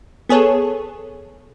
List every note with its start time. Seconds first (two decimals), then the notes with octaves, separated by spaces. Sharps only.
0.29 B3 G#4 A4 C#5